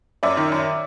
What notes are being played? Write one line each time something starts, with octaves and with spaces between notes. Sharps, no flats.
F#2 D5 E5
D#3
F#2